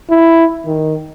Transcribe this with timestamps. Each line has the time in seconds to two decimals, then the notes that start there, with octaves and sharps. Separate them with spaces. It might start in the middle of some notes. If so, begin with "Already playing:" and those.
0.10 E4
0.66 D#3